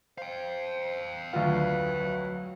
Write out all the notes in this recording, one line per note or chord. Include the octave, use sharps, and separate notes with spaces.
C5 F5 G5
D2 F#3 F4 B4